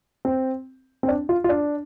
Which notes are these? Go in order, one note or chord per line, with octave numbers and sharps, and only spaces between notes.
C4
C4
D4
F4
F4
D4